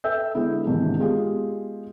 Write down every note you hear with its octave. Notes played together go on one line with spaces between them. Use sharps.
A4 B4 E5 G5 E6 G6
D3 G#3 B3 E4
G#2 C3 D#3 E3 A#3 D4
G#3 B3 F4 G4 G#4